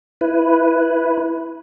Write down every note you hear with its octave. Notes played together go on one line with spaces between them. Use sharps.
E4 B4